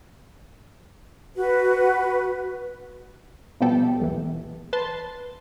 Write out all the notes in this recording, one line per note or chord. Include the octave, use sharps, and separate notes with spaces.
F#4 B4
B2 F3 G3 B3 G4 A4
B1 E2 A#2 E3
B4 A5 C6